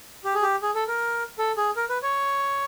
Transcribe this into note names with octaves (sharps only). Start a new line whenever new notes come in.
G4
G#4
G4
G#4
A4
A#4
A4
G#4
A#4
B4
C#5